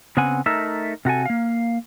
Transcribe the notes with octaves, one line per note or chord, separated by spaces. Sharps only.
C#3 B3 C4 F#5 G#5
A3 D#4 A#4 E5
C3 F#4 A4 G#5
A#3 F5